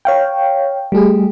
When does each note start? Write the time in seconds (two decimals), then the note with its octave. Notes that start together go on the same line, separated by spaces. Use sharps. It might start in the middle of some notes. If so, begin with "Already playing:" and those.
0.05 C#5 F5 G5
0.92 G3 A3 G4 G#4